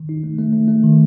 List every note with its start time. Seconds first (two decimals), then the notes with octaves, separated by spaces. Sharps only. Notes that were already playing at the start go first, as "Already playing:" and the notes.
Already playing: D#3
0.09 D#4
0.24 A3
0.39 A3
0.53 A3
0.68 A3
0.84 D#3